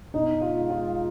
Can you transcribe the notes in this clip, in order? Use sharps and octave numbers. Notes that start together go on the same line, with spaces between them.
B2 D#4
F4
G#3
F4